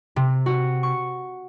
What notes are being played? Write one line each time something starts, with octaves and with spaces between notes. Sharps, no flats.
C3
F#4
C#6